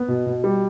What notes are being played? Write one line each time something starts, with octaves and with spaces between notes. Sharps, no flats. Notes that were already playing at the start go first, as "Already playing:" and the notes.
Already playing: B3
B2
B2
G3